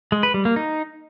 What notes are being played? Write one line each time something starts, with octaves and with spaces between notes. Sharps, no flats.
G#3
B4
G3
A#3
D#4